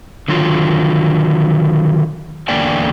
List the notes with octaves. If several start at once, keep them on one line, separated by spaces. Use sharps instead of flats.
D3 D#3 F#3 F4
E2 D3 A#3 D5 G5 G#5